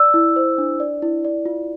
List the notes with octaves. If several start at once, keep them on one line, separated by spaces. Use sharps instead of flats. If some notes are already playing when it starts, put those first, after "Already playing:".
Already playing: D5 E6
E4
C5
D4
D5
E4
D5
F4